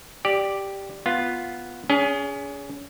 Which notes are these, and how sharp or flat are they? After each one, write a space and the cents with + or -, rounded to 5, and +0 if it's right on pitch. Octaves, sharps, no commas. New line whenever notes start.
G4 +0 D5 +0
B3 +0 F4 +0
C#4 +35 G#4 +0